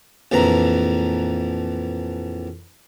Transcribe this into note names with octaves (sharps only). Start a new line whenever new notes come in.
A#1 F2 E3 A#5